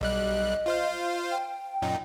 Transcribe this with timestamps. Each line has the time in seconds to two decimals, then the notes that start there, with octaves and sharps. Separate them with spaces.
0.01 B1 G3 D#5 F#6
0.66 F4 C5 F5
1.31 G5
1.82 F#2 A#2 D#4